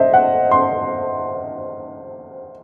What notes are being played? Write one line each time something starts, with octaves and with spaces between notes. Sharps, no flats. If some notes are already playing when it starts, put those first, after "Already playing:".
Already playing: C5 D#5 E5
F#5
C6